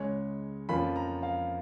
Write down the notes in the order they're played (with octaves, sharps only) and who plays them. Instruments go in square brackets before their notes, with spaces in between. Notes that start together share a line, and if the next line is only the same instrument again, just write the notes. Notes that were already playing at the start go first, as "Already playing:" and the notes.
Already playing: [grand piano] C#2 C#3 G#3 C#5
F2 F3 A#3 C#4 F4 B5
A#5
F5